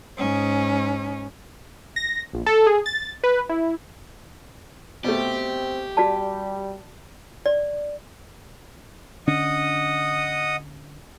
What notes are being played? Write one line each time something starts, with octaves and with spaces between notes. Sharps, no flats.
G#2 C#4
A#6
A#1
A4
G#4
A6
B4
E4
B2 A3 C4 G4
G3 F#4 D5 A5
D5
D3 C#4 D4 D#5 F#5 D#6